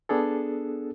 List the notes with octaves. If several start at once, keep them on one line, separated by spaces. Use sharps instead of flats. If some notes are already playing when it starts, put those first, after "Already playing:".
B3 D4 G#4 A4